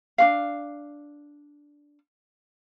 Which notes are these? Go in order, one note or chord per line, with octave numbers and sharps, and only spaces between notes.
D4 F#4 F5